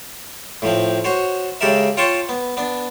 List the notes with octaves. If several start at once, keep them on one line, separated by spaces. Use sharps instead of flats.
A2 F3 C4
F#4 C5 C#5
C#3 G#3 G4 A4 A#4 E5
F4 C#5 G5 A5 C6 C#6
B3
B3 D4